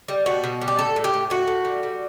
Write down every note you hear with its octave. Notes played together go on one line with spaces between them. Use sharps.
G3
B2 F#4
B2
G3
G4
A2 A4
A2
G4
A2
A2 F#4
A2
G3
G3